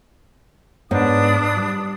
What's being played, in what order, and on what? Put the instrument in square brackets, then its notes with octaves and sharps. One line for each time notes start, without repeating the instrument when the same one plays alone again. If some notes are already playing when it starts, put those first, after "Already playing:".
[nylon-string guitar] G#2 B3 C#5 [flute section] D4 B4 D#6
[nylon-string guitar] G3